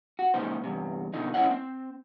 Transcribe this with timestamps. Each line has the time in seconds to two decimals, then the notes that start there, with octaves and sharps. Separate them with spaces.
0.19 F#4
0.34 C#2 A#2 F3 D#4 C5
0.64 E2 G2 C3
1.14 B2 D3 F3 D#4
1.34 C#4 E4 F#4 C#5 D#5 F#5
1.51 C4